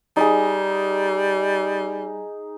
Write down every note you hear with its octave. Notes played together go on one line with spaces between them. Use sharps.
G3 D#4 G#4